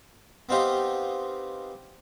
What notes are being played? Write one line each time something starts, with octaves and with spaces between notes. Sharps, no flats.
B3 C4 D#4 F4 G4